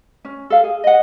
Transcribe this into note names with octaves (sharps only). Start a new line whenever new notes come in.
C#4
A4 F5
G#4
D#5 F#5